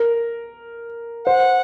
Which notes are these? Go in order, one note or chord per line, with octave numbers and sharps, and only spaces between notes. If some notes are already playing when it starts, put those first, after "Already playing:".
Already playing: A#4
C5 F#5